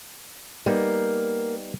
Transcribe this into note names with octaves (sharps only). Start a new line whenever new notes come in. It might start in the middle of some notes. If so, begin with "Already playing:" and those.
G3 A#3 B3 D#4